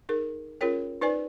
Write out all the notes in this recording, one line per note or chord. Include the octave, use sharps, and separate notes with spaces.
D#4 G#4 A#4
C#4 F4 G#4 A#4 C#5 G5
D#4 B4 C5 D5 G#5